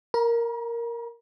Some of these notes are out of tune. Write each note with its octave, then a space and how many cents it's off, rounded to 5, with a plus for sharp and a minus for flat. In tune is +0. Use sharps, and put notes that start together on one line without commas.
A#4 +0 A#5 +45